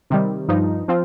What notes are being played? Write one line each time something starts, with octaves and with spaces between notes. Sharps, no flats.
C3 D#3 G3
G2 F3 D#4
F3 C4 F4